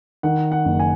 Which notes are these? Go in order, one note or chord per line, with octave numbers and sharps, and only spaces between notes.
D#3 F#5
F#5
F#1
G#5